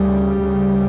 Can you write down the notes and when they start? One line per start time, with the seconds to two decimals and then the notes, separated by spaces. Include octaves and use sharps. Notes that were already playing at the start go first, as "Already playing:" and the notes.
Already playing: D2 C#3 G3
0.43 D2 C#3